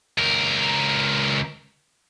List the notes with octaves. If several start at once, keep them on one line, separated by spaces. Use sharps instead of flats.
C#2 A#4